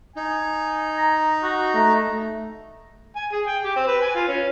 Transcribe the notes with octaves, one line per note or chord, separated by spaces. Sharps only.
D#4 G#5
A#5
F#4
A3 A#5
G#5
G#4
G5
G4
C4
B4
G#5
F4
C#4